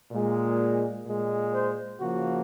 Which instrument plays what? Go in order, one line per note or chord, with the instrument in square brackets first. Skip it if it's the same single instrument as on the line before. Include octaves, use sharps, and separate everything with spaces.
[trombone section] A#2 G#3
A#2 G#3
C5
C#3 F3 A#3 F#4